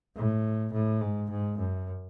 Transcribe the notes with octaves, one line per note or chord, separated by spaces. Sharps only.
A2
A2
G#2
G#2
F#2